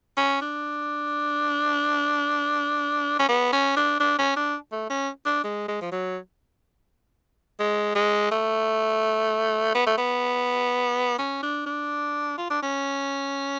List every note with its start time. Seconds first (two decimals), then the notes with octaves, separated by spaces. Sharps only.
0.17 C#4
0.42 D4
3.19 C#4
3.29 B3
3.53 C#4
3.77 D4
4.00 D4
4.19 C#4
4.36 D4
4.72 A3
4.90 C#4
5.26 D4
5.44 G#3
5.68 G#3
5.81 F3
5.92 F#3
7.60 G#3
7.95 G#3
8.31 A3
9.75 B3
9.87 A3
9.97 B3
11.19 C#4
11.43 D4
11.66 D4
12.38 F4
12.50 D4
12.62 C#4